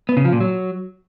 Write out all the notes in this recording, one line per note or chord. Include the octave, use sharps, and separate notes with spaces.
B3
C#3
F3
A#2
F#3